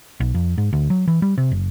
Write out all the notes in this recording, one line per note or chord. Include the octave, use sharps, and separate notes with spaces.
B1
F2
G#2
D2
F#3
E3
G3
C3
F#1